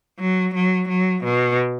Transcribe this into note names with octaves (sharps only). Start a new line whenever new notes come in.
F#3
F#3
F#3
B2